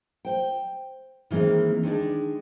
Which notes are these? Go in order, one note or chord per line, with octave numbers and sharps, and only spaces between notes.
C5 G5
D#3 E3 G#3 A#3 C4
D#3 G#3 D4 D5